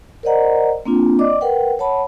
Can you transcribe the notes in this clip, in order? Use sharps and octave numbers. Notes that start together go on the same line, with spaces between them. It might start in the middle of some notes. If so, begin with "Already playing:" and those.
A#4 C5 D5 D#5 F#5 A#5
A#3 C4 D4 F4
D5 D#5 D6
A#4 B4 F#5 G5
C#5 F#5 A5 B5